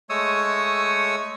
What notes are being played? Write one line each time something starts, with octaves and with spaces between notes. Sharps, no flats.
G#3 A3 C#5 D#6 E6